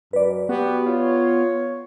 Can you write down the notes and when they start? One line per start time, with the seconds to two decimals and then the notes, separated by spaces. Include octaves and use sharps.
0.13 F#2 B4 D5
0.49 B3 F#4 G4
0.86 F4 C#5